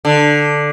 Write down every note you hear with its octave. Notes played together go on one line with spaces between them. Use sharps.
D3